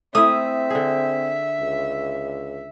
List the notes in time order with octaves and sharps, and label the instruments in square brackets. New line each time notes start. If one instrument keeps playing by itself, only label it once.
[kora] A3 E4 [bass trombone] C4 [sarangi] E5 [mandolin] D#6
[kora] D3 G#4
[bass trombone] C#2